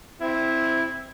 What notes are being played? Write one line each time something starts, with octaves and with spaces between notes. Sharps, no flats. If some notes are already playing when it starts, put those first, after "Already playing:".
C4 E4